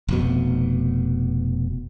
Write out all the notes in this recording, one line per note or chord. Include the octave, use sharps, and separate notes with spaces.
F1 B2